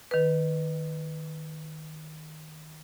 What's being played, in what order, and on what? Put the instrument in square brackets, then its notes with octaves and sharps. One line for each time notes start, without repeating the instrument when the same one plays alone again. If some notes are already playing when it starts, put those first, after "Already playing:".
[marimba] D#3 B4